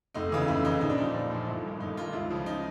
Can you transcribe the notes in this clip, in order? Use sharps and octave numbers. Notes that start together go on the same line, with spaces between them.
F1 D#4
D#2 C#3 E3
F1 E4
D#2 C#3 E3 D#4
A#1 D#4
D4
A#2 F3 D#4
A#1
A#2 F3
G1 E4
G2 D#3
G1 D#4
G2 D#3 F4
C#2 E4
C#3 F3
D#4